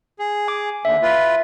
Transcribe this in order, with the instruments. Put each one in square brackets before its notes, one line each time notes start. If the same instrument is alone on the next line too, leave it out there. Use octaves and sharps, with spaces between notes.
[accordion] G#4
[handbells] G#5 D6
[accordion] D#2 D3 [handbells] E5
[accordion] F4 B4